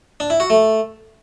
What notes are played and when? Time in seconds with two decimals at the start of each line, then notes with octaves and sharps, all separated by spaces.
0.20 D4
0.30 E4
0.40 F#4
0.50 A3